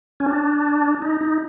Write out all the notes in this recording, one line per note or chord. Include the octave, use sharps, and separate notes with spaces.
C#4
D4
D#4
D#4